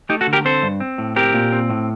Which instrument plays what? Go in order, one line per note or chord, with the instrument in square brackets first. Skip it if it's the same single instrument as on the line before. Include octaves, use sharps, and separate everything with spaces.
[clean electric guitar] A3 D#4 G4
F#4 A4
D3
G4 A#4
C4 A4 C5
G2
C4
A2
C4 G4 A#4
A#2
C4
A2